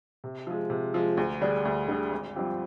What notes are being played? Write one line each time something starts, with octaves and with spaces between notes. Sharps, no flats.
C3
F3 G#3
C3
F3 G#3
D2
D3 G3 D4 G#4
D2
D3 G3 D4 G#4
G#1
G2 F3 C4 G4